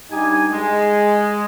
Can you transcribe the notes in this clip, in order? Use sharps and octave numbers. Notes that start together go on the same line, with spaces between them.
G2 D#4 G4 G#5
G#3